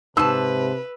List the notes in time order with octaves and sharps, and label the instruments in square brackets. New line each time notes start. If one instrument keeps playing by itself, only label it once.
[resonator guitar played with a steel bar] G#2 A5 [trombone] C3 [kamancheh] B4 [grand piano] E6